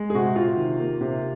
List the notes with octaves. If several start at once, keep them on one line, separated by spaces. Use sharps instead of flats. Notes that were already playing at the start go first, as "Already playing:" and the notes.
Already playing: G#3
G#4
C3 F#4
C3 F4
D#3
A#3
C3